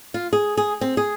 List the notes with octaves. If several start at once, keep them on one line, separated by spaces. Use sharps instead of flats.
F4
G#4
G#4
C4
G#4